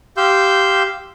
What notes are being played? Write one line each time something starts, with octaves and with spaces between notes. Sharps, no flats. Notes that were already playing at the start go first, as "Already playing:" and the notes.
G4 F5 C6 E6 G6